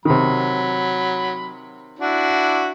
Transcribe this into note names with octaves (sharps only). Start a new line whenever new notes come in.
C3 D#3 F#3 B5
D4 E4 F#4